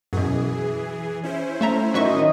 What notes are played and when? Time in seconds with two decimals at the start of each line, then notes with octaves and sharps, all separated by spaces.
0.13 F#2 B2 E3 G#4
1.23 C#4 E4 C5
1.61 A3 E5 A#5
1.94 D#3 F#3 D#5 E5 C#6